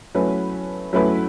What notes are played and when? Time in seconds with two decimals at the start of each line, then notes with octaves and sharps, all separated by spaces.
0.15 F#3 A3 C#4 E4 B4
0.93 F#3 A3 C#4 E4 B4